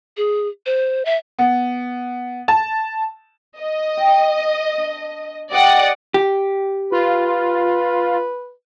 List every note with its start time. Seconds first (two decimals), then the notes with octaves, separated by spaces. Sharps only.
0.17 G#4
0.66 C5
1.05 E5
1.39 B3
2.48 A5
3.59 D#5
3.97 G5
4.78 D4
5.51 G4 D5 D#5 F#5
6.14 G4
6.92 F4 B4